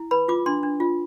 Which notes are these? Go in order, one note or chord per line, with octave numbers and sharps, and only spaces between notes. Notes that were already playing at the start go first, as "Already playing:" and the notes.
Already playing: E4
B4 B5
F4 D6
D4 C6
D4
F4